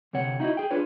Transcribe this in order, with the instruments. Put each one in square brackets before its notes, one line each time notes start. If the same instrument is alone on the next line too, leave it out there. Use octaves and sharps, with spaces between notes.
[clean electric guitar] D2 C3 C4 C#5 F#5
D#4 E4 F#4 D#5
G#4 G5
D4 F4 G#4 B4 C#5